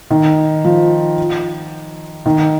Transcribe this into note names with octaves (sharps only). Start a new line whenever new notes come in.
D#3
F3
D#3